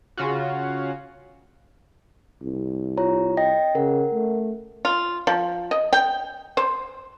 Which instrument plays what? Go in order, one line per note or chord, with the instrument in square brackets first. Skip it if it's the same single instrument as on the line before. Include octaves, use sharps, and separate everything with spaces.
[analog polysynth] C#3 C#4 F4 F#4
[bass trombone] C2
[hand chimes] F4 C#5 A#5
D#5 G5 A#6
[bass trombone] C#3 [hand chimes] A#4 F#5
[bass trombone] A3
[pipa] F4
F3
D#5
G5
C5